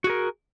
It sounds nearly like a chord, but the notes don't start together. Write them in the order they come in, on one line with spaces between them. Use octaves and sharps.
F#4 G#4 A#4